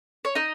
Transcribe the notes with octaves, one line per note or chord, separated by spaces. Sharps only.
C#5
D#4 D#5